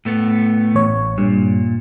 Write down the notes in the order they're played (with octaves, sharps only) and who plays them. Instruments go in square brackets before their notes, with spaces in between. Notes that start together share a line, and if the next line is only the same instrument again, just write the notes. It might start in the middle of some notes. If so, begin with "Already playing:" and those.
[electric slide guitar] A2 A3 B3
[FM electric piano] A1 C#5
[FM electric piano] G2 [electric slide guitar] A#2